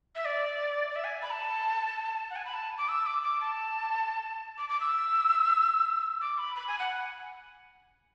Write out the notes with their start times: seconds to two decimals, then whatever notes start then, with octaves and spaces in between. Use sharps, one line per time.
0.15 E5
0.25 D5
0.91 D5
0.96 E5
1.04 G#5
1.22 B5
1.31 A5
2.30 F#5
2.36 G#5
2.45 B5
2.54 A5
2.78 D6
2.89 E6
3.06 D6
3.23 D6
3.41 A5
4.58 D6
4.69 D6
4.80 E6
6.21 D6
6.38 B5
6.56 B5
6.68 G#5
6.79 F#5